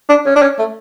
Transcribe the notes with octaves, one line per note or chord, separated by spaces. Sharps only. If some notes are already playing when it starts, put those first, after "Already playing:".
D4
C#4
D4
C#4
A3